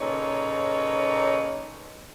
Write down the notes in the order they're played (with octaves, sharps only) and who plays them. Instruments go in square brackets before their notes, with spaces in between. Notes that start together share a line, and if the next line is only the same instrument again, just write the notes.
[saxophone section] A#2 C#3 D#4 A4 B4 C#5